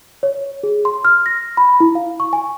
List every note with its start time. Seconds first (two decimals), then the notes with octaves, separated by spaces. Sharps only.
0.23 C#5
0.63 G#4
0.85 C6
1.05 F6
1.26 A#6
1.57 B5
1.80 E4
1.95 F5
2.20 C#6
2.33 G#5